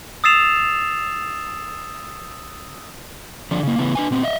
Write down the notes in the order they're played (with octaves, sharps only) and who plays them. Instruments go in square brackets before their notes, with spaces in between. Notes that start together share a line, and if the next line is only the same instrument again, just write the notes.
[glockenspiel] D#6 E6 A6 C7 E7 F7
[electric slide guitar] D3 F3 D5
C#3 A#3
C#3 E3 B3
D4 B4 G#5
A#2 B3 C4
D#5 E5